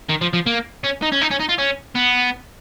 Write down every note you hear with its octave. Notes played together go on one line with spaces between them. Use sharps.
D#3
F3
F3
A#3
C#4
D#4
C#4
D#4
C#4
D#4
F4
C#4
B3